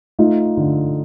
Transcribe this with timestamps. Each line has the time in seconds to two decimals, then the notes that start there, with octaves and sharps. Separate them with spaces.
0.19 A3 D#4 F4
0.57 D3